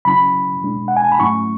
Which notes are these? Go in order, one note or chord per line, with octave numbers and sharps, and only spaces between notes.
C#3 F#3 C#4 E4 B5
B2 G#3 D4
F#5
G#5
A5
B5
G#2 F#3 A3 C#4 E4 C#6